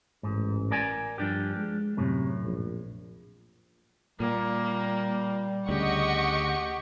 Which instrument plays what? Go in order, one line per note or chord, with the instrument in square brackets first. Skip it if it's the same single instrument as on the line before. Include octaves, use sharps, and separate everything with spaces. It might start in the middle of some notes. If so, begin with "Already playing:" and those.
[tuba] A1 [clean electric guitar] G#2
[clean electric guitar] A#4 D5 G#5
[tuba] G2 [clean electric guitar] F3 D4 G4
[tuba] G#3
[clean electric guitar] F#2 A2 [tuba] C3
[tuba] A#1
[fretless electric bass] A#2 [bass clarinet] G3 [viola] A#3
[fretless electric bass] D2 C#3 [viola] G4 [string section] D#5 F#5 C#6